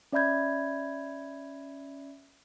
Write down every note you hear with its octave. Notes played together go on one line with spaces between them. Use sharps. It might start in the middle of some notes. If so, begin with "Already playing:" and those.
C#4 D5 E5 B5 G6 G#6